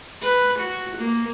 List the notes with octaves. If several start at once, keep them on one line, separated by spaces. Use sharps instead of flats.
B4
F#4
A#3